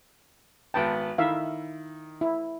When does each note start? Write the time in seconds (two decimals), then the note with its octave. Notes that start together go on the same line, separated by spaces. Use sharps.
0.74 G#1 B3 G5 A5
1.18 D#3 E4 E5 F5
2.21 E4